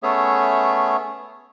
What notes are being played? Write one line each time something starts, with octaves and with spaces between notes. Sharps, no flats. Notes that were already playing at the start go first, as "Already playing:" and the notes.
A3 B3 C#4 G#4 C#5 E5